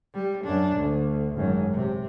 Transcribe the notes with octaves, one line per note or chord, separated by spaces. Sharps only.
G3
F#2 D4
D2
G#1 F#2
C3